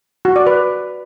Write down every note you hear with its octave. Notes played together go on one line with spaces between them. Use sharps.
F#4
D5
B4